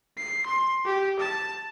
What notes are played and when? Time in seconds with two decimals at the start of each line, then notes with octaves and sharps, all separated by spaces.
0.18 C7
0.46 C6
0.85 G4
1.19 A5